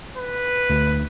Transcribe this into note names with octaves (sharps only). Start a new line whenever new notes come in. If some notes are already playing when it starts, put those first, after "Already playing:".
B4
D2